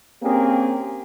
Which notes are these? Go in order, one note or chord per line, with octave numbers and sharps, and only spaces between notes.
A#3 C4 C#4 G4 G#4 A#4